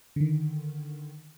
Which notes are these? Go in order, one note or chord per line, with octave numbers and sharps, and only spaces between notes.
D3 D#3